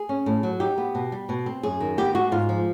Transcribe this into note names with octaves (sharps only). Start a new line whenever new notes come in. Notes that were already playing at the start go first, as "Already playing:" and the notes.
Already playing: G#4
C#4
A2
F#3
D#4 G4
B3
B2
G3
B2
C4
F#2 G#4
D#3
B3 G4
G#3 F#4
G#2 F4
F3